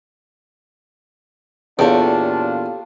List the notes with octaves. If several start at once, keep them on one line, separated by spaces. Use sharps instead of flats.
E2 A#2 D4 F4 G4 A4 C#5